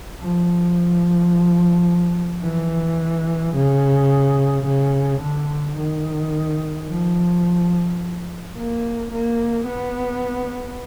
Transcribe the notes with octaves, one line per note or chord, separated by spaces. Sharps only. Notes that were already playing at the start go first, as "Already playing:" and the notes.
F3
E3
C#3
C#3
D3
D#3
F3
A#3
A#3
B3